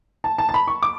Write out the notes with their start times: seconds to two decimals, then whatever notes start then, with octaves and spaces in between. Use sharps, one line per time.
0.24 A5
0.38 A5
0.49 A5
0.54 B5
0.68 C#6
0.83 D6